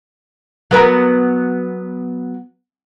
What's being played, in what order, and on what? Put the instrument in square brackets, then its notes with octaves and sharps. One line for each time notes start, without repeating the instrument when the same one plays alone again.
[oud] F#3 B3 A#4